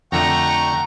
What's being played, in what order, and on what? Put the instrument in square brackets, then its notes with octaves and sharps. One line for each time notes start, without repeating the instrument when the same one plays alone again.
[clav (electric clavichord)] F2 D3 [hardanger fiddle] A3 A#5 [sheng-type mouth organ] F#5 G5 C#6